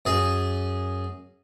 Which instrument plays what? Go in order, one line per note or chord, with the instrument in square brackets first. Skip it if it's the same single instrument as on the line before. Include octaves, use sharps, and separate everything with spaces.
[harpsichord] F#2 G#4